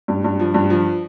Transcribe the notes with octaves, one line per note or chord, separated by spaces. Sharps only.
G2
G2
F3
G2
F3